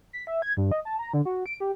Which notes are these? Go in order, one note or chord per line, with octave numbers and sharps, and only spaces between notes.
B6
E5
G#6
G2
D#5
A5
A#5
D3
F#4
D7
G4